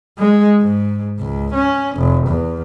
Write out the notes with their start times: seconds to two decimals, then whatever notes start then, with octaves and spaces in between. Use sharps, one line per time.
0.18 G#3
0.60 G#2
1.19 C#2
1.54 C#4
1.96 F1
2.27 E2